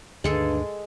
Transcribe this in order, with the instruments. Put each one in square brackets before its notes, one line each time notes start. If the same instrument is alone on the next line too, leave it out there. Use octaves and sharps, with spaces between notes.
[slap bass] D2 D3 D#3 [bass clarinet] G2 [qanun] G#3 G#4 A4